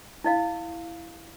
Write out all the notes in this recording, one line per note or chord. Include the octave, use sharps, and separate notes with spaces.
E4 D#5 F5